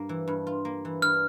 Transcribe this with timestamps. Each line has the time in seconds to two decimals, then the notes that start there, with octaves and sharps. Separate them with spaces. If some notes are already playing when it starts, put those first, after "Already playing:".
Already playing: G2 A#3
0.09 E3
0.28 G2
0.47 F4
0.65 A#3
0.85 E3
1.02 G2 F6